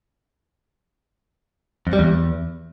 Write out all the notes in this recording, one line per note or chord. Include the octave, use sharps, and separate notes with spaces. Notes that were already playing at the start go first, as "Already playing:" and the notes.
F2
G3
E2